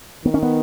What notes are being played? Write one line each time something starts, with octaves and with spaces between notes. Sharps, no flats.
D#3 B3
C#4
B3